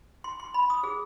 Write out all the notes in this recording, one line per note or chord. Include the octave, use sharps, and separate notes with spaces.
C6
C6
B5
D#6
G#4